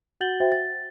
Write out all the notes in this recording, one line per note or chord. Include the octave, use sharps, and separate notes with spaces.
F#4 F#5 G6 A6 F#7 G7
F#4 C5 E5 G5 A6
A6